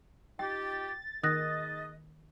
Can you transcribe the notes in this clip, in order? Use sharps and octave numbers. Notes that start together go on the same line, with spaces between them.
D#4 F4 G4 G5 A6
D#3 D#4 G#4 D#5 D#6 F#6 A#6